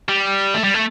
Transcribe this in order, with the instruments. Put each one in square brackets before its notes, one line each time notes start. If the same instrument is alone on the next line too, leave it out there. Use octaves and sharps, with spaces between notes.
[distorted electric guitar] G3
A3
G3
A3